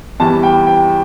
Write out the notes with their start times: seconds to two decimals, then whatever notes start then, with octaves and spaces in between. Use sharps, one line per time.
0.20 E2 E3 G3 A5
0.43 G5
0.67 G5